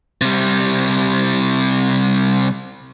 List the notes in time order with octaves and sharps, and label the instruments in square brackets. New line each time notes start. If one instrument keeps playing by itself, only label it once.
[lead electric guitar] C3 G3